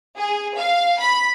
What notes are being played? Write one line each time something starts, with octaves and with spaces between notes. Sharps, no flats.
G#4
F5
B5